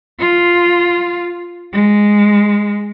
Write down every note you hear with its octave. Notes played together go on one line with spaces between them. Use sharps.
F4
G#3